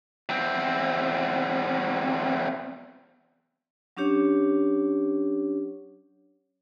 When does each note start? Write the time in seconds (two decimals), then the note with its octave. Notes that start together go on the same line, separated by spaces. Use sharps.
0.29 E2 C4
3.97 F#3 C#4 D4 G4 C#5